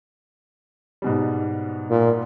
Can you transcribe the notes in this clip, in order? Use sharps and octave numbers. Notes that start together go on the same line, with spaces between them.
G#2 B2 G3
A#2